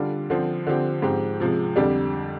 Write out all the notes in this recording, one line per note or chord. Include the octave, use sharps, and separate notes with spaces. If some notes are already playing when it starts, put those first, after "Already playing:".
Already playing: D3 G3 D4 F4
D3 F3 C4
D3 F3 C4 G4
G#2 F3 C4 G4
C3 F3 G#3
F2 D3 G3 D4 G4